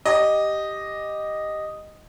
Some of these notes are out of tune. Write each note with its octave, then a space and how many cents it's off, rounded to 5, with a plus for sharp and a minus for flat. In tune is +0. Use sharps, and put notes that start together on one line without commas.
G4 +0 D#5 -5